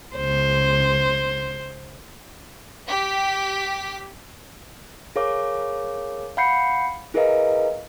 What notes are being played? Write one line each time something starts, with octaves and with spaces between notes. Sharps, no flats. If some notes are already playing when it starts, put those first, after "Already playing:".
C#2 C5
G4 B6
G#4 A#4 C#5 F5 D6
F5 F#5 B5 G6 C7 C#7
E4 G#4 A#4 B4 D#5 F5